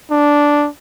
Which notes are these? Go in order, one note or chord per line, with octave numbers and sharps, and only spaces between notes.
D4